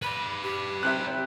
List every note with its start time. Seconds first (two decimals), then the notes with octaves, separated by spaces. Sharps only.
0.02 B4 D5 B5
0.43 G4
0.83 C3 E5 G5 F#6